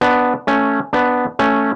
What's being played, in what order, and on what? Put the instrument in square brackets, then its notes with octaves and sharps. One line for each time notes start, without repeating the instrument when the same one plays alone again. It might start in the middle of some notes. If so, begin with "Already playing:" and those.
[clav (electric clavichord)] B3 D4
A3 C#4
B3 D4
A3 C#4